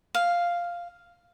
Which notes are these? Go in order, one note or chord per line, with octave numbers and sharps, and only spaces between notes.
F5